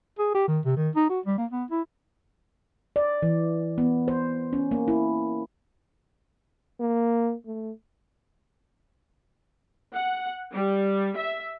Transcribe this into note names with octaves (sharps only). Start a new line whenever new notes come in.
G#4
G4
D#3
C3
D#3
D#4
F#4
G3
A#3
B3
E4
D5
E3
B3
C5
C#4
A#3
E4
A#3
A3
F#5
G3
E5